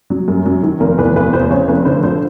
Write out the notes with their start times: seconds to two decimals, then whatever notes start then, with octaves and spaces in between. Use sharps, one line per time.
0.10 F#3
0.28 F#2
0.46 F#3
0.63 D#3
0.80 F1 A#4
0.98 E2 B4
1.16 F1 B4
1.33 E2 C5
1.50 C#3 C#5
1.68 F1 B4
1.85 D3 C5
2.03 F3 C5